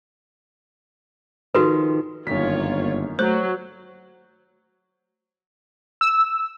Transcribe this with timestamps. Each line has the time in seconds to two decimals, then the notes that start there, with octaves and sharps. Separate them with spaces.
1.55 D#3 F3 F#4 A4 B4
2.27 G1 F#2 D#3 A#3 F4 C#5 B6
3.19 F#3 A3 C5 F#6
6.01 E6